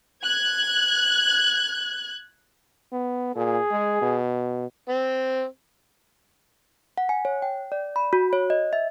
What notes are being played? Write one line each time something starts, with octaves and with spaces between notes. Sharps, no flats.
F#6 G#6
B3
A#2 G#4
G#3
B2
C4
F#5
G#5
C#5
G5
D5
B5
F#4
C#5
D#5
E5